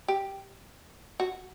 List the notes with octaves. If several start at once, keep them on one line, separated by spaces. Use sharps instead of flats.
G4
F#4